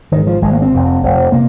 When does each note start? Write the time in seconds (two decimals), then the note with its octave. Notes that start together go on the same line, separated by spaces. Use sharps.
0.12 G#1 G#2 D#3
0.27 F3
0.42 G#1 G#3
0.45 G#2
0.52 A#3
0.62 C4
0.72 F1 F2 C3
1.03 F1 F2 C3
1.32 C3 A#3